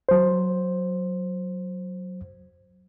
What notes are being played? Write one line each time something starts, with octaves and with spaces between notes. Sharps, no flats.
F#3 C5